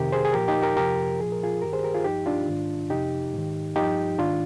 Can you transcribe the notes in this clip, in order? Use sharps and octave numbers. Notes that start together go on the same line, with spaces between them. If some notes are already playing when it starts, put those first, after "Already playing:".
Already playing: F2 C3 D#3 G4 A#4
G#4 C5
G#4
A#2 F3 G4 A#4
D#4 G4
G4 A#4
F2 C3 F3 G4 A#4
A#2 F3 G#4
A#4
F4 G#4
G2 D#3 G4 A#4
G#4 C5
G4 A#4
F4 G#4
G2 F3 D#4 G4
D4 F4
G#2 D#3
F2 C3 F3 D#4 G4
G#2 D#3
G2 F3 D#4 G4
G#2 D#3 D4 F4